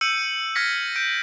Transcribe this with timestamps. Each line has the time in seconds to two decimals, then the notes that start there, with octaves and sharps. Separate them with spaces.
0.01 E6 G6 C#7 D#7 F#7
0.55 E6 F6 G#6 A#6 B6 C#7
0.96 G6 D7